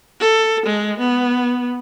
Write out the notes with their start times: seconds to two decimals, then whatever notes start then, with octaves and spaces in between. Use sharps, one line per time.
0.20 A4
0.66 G#3
0.99 B3